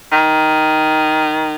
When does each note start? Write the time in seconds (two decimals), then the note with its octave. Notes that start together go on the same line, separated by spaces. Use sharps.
0.12 D#3